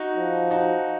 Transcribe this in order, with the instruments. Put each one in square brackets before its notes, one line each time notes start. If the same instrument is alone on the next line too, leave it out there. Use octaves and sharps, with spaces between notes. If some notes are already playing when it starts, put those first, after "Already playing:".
Already playing: [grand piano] D#4 F#4
[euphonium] F3
[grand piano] D#4 F#4